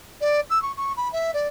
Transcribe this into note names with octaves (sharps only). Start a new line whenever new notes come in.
D5
E6
C#6
C#6
B5
E5
D5